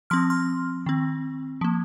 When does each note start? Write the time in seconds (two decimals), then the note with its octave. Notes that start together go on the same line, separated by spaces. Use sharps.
0.10 F3 C4 C6 F6
0.30 C6 F6
0.86 D#3 C4
1.61 F3 A#3